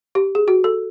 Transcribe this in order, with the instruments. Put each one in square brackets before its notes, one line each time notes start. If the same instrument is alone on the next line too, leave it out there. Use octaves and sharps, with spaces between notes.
[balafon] G4
G#4
F#4
A4